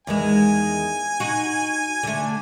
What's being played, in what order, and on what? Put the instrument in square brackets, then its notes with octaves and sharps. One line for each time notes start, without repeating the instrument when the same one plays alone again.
[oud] E2 D#3 G#3 [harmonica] G#5
[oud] D#4 F#4
D3 A3